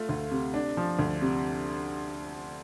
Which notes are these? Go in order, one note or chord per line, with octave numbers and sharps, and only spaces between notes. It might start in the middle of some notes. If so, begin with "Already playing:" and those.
Already playing: A3 F4
D2
C3
D4
F3
D2
C3